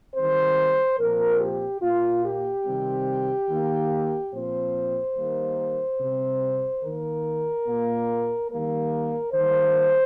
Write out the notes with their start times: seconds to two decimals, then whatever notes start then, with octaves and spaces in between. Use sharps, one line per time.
0.15 D#3 G3 C4 C5
0.98 A#2 F3 C4 A#4
1.41 G4
1.81 A#2 A#3 F4
2.24 G4
2.65 C3 D#3 G3 C4
3.49 D#3 A#3
4.32 A#2 F3 C4 C5
5.16 D#3 G3 A#3
5.99 C3 G3 C4
6.83 D#3 A#3 A#4
7.67 A#2 A#3
8.50 D#3 G3 A#3 A#4
9.33 D#3 G3 A#3 C5